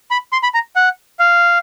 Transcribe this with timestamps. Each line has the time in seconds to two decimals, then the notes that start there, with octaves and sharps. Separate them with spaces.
0.11 B5
0.32 C6
0.43 B5
0.54 A#5
0.76 F#5
1.19 F5